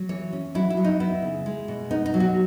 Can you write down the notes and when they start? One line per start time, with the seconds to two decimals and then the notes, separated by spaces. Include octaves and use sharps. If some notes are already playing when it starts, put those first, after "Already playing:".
Already playing: F#3
0.09 E3 C#5
0.33 C#4
0.55 F#3 E4
0.70 E4
0.77 F#3
0.84 D#4
1.00 B3 E4
1.22 C#3
1.46 G#3
1.68 B2
1.90 B3 D#4
2.06 D#4
2.14 F#3
2.20 F#4